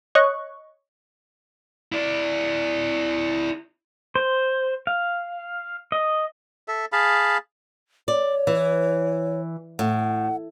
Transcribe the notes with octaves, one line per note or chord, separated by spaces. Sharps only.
C#5 D#5 C#6 F#6
E4 D5
C5
F5
D#5
A4 E5
G#4 F5 A5 B5
C#5 D5
E3
A2 F#5